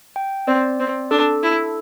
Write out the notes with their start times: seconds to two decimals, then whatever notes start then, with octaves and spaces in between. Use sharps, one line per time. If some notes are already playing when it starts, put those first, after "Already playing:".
0.16 G5
0.47 C4 D5
0.80 C4
1.11 D4 A4
1.43 E4